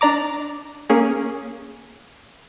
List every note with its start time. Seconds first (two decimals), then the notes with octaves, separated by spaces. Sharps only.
0.01 D4 D5 A#5 D6
0.90 A#3 C#4 G#4